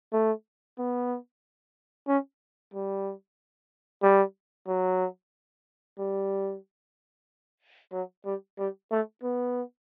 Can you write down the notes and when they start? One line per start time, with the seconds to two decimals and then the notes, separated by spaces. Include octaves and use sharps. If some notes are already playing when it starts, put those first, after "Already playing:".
0.12 A3
0.79 B3
2.08 C#4
2.74 G3
4.03 G3
4.67 F#3
5.99 G3
7.92 F#3
8.25 G3
8.59 G3
8.91 A3
9.23 B3